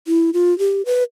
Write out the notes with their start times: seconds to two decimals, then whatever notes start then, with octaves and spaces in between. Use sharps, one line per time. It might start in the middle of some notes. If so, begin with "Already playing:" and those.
0.07 E4
0.34 F4
0.59 G4
0.86 B4